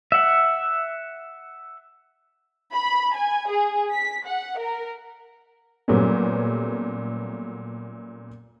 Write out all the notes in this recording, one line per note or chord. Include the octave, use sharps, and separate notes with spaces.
E5 F#5
B5
G#5
G#4
B6
F#5
A#4
A#2 F#3 G3 A3 B3 C#4